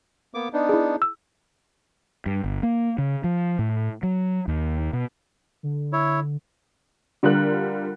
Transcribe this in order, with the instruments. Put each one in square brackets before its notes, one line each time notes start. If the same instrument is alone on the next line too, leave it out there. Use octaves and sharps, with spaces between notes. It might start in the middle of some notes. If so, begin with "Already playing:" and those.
[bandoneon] A#3 B3 D6
B3 D4 D#4
[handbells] E4 G#4
E6
[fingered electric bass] G2
G1
A#3
C#3
F3
A2
F#3
D#2
B2
[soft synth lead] D3
[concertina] E4 C#5
[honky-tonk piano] D3 G3 F4 A#4 F#6